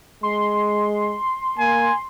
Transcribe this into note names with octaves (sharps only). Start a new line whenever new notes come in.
G#3 C6
A#3 G#5